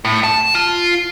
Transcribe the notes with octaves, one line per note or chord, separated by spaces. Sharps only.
A2
A5
F4